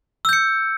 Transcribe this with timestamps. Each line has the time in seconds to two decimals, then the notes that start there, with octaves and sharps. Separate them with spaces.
0.25 E6
0.29 G6
0.33 C#7